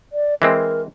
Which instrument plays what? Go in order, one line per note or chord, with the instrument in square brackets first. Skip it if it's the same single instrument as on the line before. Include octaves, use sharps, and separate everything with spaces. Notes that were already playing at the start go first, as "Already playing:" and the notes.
[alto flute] D5
[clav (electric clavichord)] E3 G#3 C4 [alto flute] A#4